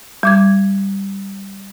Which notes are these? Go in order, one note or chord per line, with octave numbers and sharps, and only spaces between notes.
G3 D6 G#6